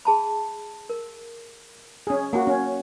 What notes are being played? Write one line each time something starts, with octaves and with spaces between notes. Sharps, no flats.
G#4 A5 B5
A#4
C#4 G#4
A#3 F#4 F#5 G#5
C#4